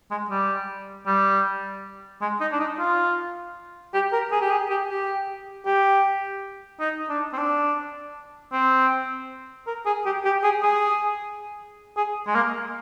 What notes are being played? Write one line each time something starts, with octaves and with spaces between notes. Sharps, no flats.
G#3
G3
G3
G#3
D#4
D4
D#4
F4
G4
A#4
G#4
G4
G#4
G4
G4
G4
D#4
D4
C4
D4
C4
A#4
G#4
G4
G4
G#4
G#4
G#4
G#3
A#3